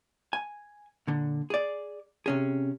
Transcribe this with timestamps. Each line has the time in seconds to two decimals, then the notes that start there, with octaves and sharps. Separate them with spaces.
0.33 G#5
1.07 A#2 D3
1.50 G#4 D5
2.26 C3 C#4 G#4